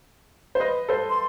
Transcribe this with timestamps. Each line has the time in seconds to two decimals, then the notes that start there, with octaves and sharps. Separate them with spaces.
0.55 C5
0.60 B4 D#5
0.89 A4 C5
1.10 C6